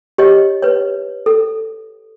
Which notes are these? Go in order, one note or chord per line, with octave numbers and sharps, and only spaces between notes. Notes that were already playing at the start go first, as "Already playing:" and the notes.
G4 C#5 D#5
B4 C#5
A4